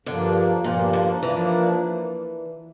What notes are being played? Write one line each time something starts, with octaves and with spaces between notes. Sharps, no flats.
G2 D3 F3 A#3 D4
G2 A#2 F3 A#3 D4
D3
E3 F3 A#3 D4